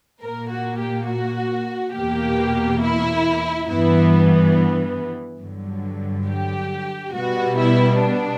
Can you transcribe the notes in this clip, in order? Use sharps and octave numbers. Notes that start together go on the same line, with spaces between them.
A#2 A#3 A#4
F#4
G4
F#4
E2 B2 A#3 G4
E4
G2 E3 B3 E4
G2 D3 F#3
G4
B2 G3 B3 F#4
E4
D4